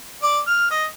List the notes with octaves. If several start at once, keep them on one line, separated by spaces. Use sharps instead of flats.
D5
F6
D#5